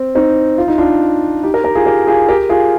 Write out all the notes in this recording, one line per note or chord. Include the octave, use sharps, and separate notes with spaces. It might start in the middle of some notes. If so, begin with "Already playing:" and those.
Already playing: C4
C4 D#4
F4
D#4
D4 F4
D#4 G4
G4 A#4
G4 A#4
F4 G#4
G4 A#4
F4 G#4
G4 A#4
F4 G#4